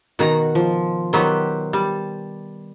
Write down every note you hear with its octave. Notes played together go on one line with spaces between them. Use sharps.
B2 D#3 F#4 A#5
F3
D#3 F#3 B3 G4 C5
G3 A5